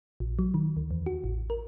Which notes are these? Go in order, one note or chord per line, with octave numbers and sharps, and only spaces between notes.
A#1
F#3
D#3
D2
E2
F#4
A1
A#4